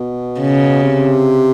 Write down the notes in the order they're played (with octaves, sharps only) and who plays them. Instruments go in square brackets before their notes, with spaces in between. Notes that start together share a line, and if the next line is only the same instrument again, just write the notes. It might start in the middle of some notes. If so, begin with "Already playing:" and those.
Already playing: [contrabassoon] B2
[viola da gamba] C#3
[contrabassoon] C3